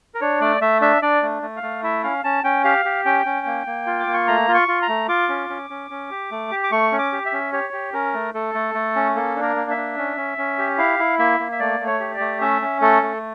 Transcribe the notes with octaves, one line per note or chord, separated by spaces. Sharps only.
A#4
D4 C#5
A3 D5
A3 E5
D4 E5
D4 D5
A3
A3
F5
A3
E4 E5
C#4 F5
C#4 A5
C#4 G5
G4 F5
G4
C#4 G5
C#4
A#3
A#3
F4
D6
A#3
C#6
A3 A#5
F4
C#6
F4
A#5
A3
F4 D6
C#4
C#4
C#4
C#4
G4
A3
G4
D6
A3 C#6
C#4
D6
G4
E5
C#4
G4 C#5
G4
C#4 A#4
A3
A3 A4
A3
A3
C#4
A#3 A4
D4
A#4
A#3
E5
D4
C#4
C#4
C#4
G4
E4 F5
E4
A#3 E5
A#3
E5
A3 D5
A3
C#5
G4
D5
A3
C#4 E5
C#4
A3 A4
A3